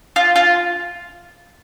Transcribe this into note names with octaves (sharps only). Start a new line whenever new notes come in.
F4
F4